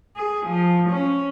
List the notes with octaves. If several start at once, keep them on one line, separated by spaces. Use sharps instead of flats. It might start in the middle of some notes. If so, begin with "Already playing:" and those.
G#4
F3
C#4